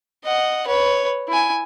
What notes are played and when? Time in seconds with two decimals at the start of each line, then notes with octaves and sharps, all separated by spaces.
0.25 D#5 F#5
0.67 B4 C#5
1.29 E4 G#5